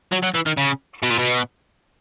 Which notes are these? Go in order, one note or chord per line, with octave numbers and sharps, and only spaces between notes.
F#3
F#3
E3
D#3
C#3
B2
A#2
B2